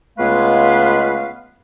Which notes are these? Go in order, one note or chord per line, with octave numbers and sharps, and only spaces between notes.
C#2 G#3 A3 B3 B4 F5